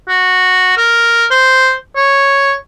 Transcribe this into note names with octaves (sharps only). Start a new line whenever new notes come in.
F#4
A#4
C5
C#5